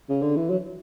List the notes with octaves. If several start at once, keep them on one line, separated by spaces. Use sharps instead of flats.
C#3
D3
E3
F#3